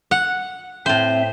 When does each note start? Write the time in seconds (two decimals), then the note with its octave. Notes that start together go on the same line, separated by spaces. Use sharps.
0.11 F#5
0.86 A2 C4 C5 E5